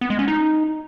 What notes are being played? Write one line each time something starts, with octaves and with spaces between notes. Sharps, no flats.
B3
G#3
C#4
D#4